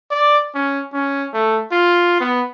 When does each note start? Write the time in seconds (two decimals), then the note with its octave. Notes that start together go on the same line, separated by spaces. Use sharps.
0.11 D5
0.55 C#4
0.93 C#4
1.33 A3
1.72 F4
2.20 B3